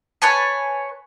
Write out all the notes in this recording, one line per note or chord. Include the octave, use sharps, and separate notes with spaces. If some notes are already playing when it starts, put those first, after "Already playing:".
B4 C#5 G#5 A5